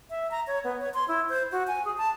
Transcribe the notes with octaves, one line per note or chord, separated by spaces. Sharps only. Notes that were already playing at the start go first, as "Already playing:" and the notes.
E5
A#5
C#5
B3
C#5
C6
E4
C5
F#4
G#5
G#4
A5